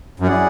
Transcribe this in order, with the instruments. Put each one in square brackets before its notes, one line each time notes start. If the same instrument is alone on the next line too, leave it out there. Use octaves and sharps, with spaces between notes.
[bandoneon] F#2
[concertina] C#4 E4 G#4 D5 F#5